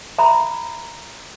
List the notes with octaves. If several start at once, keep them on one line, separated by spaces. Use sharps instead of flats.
E5 A#5 B5